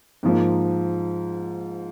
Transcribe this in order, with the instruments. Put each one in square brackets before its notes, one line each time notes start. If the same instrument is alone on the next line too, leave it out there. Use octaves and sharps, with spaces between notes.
[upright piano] G#2 F3 A#3